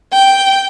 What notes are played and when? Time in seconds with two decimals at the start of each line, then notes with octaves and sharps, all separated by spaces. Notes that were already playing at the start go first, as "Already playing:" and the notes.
0.14 G5